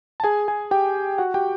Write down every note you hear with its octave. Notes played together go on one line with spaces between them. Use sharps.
A5
G#4 G#5
G#4 G#5
G4 G5
F#4 F#5
G4 G5